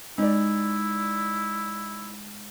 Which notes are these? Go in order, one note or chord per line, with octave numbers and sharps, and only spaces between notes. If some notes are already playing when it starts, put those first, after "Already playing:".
G#3 D#4 E4 D5